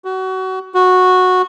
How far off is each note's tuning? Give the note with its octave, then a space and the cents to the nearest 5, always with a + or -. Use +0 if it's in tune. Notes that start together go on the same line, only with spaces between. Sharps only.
F#4 +25
F#4 -10